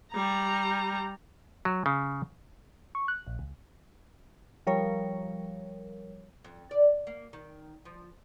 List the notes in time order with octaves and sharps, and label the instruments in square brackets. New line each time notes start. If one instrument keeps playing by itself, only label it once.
[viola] G3 A#5
[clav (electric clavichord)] F#3
C#3
[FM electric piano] C#6
F#6
A#1
C#2
[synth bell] F3 G3 A#4 C#5
[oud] F2
D5
A#3
D#3
F3